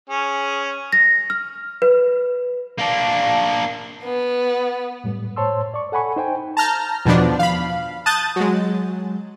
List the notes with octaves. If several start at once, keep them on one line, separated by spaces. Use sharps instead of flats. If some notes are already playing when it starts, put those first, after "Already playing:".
C#4 G#4
A#6
F6
B4
A#3 D4
B3
F#2 A2 G3
A2 C5 C#5 A5 C6 E6
D5 C#6
A4 F#5 G#5 B5 C#6
D#4 C5 G5 G#5
A5 A#5 F6 G6
E2 B2 D#3 F3 B3 D4
F5 B5
A5 D#6 F#6 G6 A6
F#3 G#3